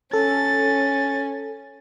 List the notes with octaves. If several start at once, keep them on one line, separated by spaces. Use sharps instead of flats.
C#4 A4 A6